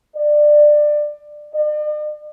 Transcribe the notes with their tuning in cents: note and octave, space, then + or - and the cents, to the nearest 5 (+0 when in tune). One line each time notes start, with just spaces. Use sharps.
D5 +20
D5 +45